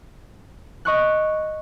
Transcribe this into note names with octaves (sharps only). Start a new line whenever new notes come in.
D#5 C#6 F#6